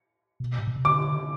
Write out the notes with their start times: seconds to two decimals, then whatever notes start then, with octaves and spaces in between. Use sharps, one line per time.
0.40 B2
0.59 A2
0.67 B2
0.76 C3
0.85 D3 D6